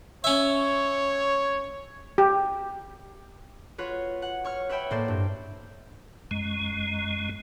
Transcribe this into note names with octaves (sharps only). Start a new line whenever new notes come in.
C#4 C#5 E5
G4
F4 F#4 B4 C#5
F#5
C#5 C#6 F6
B4 C#5 E5 G5 B5
A2 A#3 C5 D5 G6
G2
F#2 G#3